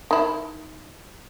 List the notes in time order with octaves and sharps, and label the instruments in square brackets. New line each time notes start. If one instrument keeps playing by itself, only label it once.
[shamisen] D#3 E4